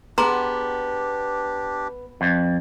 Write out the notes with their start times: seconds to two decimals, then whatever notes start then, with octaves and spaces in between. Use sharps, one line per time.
0.18 B3 D4 G4 G#4 A#5 C6
2.21 F2